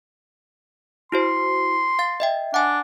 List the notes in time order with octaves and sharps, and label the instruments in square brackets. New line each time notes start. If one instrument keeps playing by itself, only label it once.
[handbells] E4 F#4 C5 [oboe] C6
[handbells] F5 A6
D#5 E5 G5
[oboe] D4 [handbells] F#5 G#5